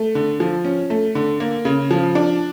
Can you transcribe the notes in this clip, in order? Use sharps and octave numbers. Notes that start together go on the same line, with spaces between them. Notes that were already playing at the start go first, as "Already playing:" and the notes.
Already playing: A3
D3
F3
C#4
A3
D3
A#3
C#3
F3
D4